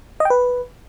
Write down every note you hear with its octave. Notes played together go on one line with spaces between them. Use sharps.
D#5
G5
B4